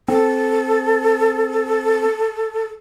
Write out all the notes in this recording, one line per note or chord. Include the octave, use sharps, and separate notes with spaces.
C4 A4